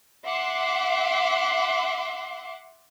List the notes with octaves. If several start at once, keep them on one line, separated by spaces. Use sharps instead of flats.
E5 F#5 C6 D6